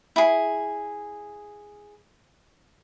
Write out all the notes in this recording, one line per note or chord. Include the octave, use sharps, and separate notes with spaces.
E4 G#4